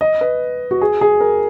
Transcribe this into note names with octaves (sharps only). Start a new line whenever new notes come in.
D#5
B4
F#4
G#4
G#4
A#4